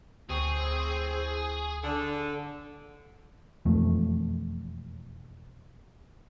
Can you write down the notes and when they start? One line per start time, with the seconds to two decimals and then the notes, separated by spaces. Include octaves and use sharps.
0.29 D2 A2 C4 G#4 C#6
1.84 D3
3.65 E1 F2 A3